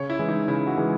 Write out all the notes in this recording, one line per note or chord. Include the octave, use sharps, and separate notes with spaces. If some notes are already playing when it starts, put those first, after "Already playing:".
Already playing: C#3 C#5
E4
E3 G#3
D#4
C#3 E4
F#4
E3 G#3